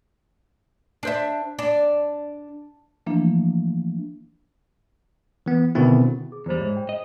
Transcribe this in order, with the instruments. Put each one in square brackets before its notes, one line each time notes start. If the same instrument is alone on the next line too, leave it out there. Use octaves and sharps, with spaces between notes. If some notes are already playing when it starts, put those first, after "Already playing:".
[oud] D4 C5 E5
D4
[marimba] E3 F3 A3 A#3 D4 E4
[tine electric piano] E3 B3
B2 D3 D#3 B3 C4 E4
[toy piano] G#4
[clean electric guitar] E2 G3 [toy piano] E4 C5 B5
[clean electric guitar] G#2 [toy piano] C#5 D5 E5
[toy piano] D5 G5
[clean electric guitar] D#5